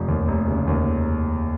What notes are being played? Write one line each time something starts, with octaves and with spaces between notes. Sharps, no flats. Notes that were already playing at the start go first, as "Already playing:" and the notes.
Already playing: F1 F3
D#2
F1
C#3
D#2